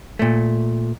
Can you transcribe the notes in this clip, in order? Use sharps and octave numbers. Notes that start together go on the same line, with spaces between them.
A#2 A3